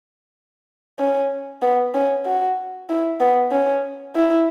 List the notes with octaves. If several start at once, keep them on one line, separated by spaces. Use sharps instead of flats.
C#4
B3
C#4
F#4
E4
B3
C#4
E4